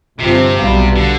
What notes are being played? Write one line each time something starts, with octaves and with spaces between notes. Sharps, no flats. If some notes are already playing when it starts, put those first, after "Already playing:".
G1 G2 C3 F3 C4
B1 B2 G3 B3 F4
D3